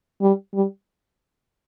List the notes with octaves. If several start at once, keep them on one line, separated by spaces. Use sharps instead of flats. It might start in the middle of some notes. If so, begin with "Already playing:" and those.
G3
G3